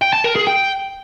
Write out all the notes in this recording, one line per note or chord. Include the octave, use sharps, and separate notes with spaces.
G5
A5
A#4
G#4
G5